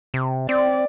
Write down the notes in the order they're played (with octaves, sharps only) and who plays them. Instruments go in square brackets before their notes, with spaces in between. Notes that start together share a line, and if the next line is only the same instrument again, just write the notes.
[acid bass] C3
[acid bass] C4 [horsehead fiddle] D5